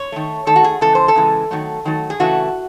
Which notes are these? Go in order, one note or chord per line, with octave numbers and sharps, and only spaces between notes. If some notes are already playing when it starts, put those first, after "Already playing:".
Already playing: C#5
D#3 A3
D#3 A3 A4
F#4
G#4
C#3 E3 G#3 A4
C5
A4
C#3 E3 G#3
D#3 F#3 A3
D#3 F#3 A3
G#4
C#3 E3 A3 F#4